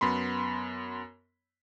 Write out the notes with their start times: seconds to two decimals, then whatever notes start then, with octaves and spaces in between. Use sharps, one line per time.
0.01 F#2 B3 B5 C6